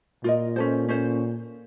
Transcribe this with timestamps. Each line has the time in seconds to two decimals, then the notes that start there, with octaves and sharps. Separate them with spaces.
0.24 A#2 F4 A#4 D#5
0.56 C#4 A4 C5
0.89 C#4 A4 C5